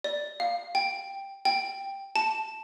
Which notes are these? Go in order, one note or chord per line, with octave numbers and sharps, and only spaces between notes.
D5
F5
G5
G5
A5